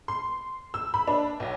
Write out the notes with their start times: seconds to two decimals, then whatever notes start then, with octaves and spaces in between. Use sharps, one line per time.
0.08 C6
0.74 E6
0.94 B5
1.07 D4
1.40 B1